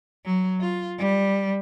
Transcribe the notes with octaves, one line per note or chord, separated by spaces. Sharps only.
F#3
F4
G3